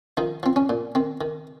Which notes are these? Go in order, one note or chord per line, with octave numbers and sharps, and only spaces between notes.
D#3 F3 D#4
F3 C4
C#4
A#2
D#3 C4
D#3